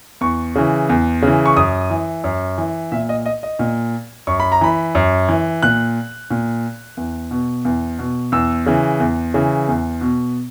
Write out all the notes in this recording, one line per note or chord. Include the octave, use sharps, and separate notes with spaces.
E2 C#6
C#3 E3
E2
C#3 E3
C#6
F#2 D#6
E3
F#2
E3
A#2 E5
D#5
D#5
D#5
A#2
F#2 C#6
B5
A#5
E3 B5
F#2
E3
A#2 F#6
A#2
E2
B2
E2
B2
E2 E6
C#3 E3
E2
C#3 E3
E2
B2